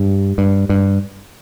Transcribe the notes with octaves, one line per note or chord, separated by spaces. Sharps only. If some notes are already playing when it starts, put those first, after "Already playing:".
Already playing: G2
G2
G2